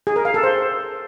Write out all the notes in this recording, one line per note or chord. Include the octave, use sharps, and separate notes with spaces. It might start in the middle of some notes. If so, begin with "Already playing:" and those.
G#4
A#4
F5
A4
C5